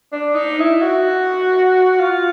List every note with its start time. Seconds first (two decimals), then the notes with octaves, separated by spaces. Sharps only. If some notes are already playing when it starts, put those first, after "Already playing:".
0.12 D4
0.35 D#4
0.60 E4
0.82 F#4
2.00 F4